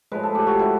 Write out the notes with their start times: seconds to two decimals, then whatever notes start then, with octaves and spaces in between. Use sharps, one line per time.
0.12 A2 F3 G#3 B4
0.23 A4
0.35 G4
0.47 F#4
0.59 E4